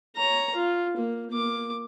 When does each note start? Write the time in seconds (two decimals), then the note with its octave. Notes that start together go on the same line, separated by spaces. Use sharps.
0.17 C#5 A#5
0.55 F4
0.97 A#3
1.31 A#3 D6